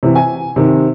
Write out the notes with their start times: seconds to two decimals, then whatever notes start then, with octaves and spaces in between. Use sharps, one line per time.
0.03 C3 E3
0.15 G#5
0.56 C3 D#3